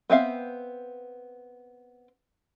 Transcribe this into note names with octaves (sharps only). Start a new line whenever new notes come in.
B3 C4 E5 F5